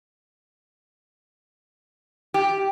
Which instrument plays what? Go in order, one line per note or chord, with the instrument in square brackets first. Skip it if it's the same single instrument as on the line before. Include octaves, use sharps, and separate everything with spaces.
[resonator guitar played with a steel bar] G4